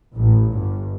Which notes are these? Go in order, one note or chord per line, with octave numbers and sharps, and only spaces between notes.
A1 A2
G1 G2